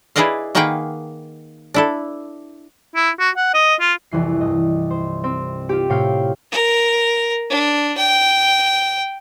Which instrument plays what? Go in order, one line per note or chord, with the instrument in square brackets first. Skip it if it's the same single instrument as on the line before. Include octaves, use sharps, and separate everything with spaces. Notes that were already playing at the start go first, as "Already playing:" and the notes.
[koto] E4 G#4 B4 D5 D#5 F5
D#3 A#3 G#4 B4 F#5 G5
D4 E4 A4
[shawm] E4
F#4
F#5
D#5
F4
[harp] C2 F2 E3 C7
G2 D#5
C5
C4
F4 G4
A2 C3 C#5 F5 G5 C7
[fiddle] A#4
D4
G5